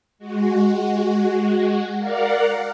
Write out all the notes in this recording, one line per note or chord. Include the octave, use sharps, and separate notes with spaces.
G#3 F#4
A#4 D5 F5 F#5